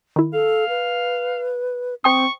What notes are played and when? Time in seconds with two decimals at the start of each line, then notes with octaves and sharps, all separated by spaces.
0.16 D#3 E4
0.33 A4 F5
0.69 B4
2.04 C4 C5 G5 C#6 D#6